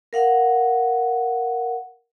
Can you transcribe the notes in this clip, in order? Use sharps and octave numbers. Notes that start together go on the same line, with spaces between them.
A#4 F5 F#5